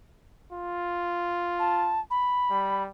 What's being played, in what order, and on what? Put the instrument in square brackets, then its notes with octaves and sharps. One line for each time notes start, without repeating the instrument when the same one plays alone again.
[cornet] F4
[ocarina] A5
B5
[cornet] G3